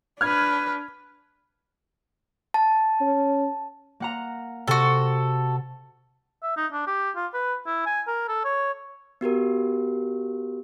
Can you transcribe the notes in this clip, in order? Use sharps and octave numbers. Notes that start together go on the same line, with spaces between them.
D4 B4 F6 G#6
A5
C#4
A#3 F#5 A#5
C3 F#4 A4
E5
D#4
D4
G4
F4
B4
E4
G#5
A#4
A4
C#5
B3 F#4 G4 A#4